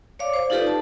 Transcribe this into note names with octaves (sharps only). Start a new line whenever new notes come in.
C#5 D5 F5 D6
C5
D#4 F4 G4 A4 B4 D5
A5